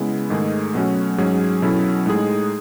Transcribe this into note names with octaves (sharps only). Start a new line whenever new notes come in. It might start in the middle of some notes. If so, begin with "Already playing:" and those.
Already playing: C#3 G#3 B3 E4
G#2 D#3 A3 D#4 G#4
B2 F#3 A3 C#4 F#4
G#2 F#3 C#4 G#4
B2 F#3 C#4 E4 A4
A2 G#3 D#4 G#4